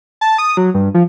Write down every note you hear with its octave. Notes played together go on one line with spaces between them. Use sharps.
A5
D#6
F#3
G2
F3